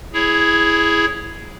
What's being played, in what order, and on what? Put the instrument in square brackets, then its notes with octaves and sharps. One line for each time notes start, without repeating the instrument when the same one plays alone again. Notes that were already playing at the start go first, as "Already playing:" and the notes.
[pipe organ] E4 G#4 C#5